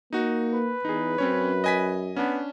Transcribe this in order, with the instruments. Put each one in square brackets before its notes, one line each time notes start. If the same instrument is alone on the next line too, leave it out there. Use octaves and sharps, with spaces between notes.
[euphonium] A#3 [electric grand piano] D#4 F#4
[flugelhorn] B4
[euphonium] E2 [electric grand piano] D#4 G#4
[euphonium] F#2 [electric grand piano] C4 C#4 C#5
[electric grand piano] D#5 G#5 B6
[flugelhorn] B3 [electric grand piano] C#4 D4